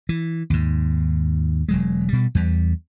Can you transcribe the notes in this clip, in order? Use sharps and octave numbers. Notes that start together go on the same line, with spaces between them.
E3
D#2 G#2
E1 F#3 G#3
B2 G3
E2 G3